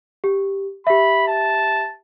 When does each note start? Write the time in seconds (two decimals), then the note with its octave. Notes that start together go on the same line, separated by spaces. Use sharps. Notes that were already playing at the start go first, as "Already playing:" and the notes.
0.24 G4
0.87 G4 E5 B5
1.28 A5